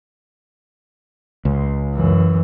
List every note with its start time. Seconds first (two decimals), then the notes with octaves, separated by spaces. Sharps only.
1.45 C#2
1.96 F#2 E3